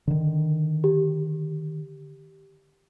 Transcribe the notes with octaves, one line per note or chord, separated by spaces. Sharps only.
D3 D#3
G4